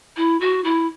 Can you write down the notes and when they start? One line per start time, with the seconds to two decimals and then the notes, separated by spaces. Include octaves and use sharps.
0.17 E4
0.40 F#4
0.64 E4